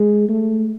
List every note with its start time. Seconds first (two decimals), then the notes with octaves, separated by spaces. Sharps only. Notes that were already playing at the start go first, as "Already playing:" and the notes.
Already playing: G#3
0.29 A3